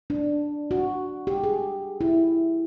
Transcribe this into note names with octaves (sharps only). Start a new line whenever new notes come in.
D4
F#4
G4
G#4
E4